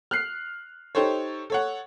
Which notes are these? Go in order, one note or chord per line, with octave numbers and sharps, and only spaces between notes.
F6 F#6 C7
D#4 G4 A4 C5 C#5
A4 C#5 F#5